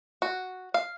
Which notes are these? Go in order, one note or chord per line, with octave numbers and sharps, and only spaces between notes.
F#4
F5